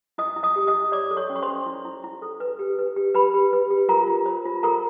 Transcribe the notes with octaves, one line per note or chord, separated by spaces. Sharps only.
E4 D#5 D#6
E4
D#5 D#6
G4
D#5 D#6
E4
C#5 D5 D6
A4
C#5 C#6
C#4
C#6
C5 C6
C#4
E4
E4
E4
A4
B4
G4
B4
G4
G4 B4 B5
G4
B4
G4
F4 A#4 A#5
F4
C5
F4
A4 A#4 A#5